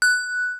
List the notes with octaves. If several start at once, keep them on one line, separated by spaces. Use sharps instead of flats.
F#6